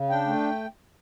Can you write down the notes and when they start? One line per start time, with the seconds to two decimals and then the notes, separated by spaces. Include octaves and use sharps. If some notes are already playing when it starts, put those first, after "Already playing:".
Already playing: C#3
0.10 D4 G5
0.26 A3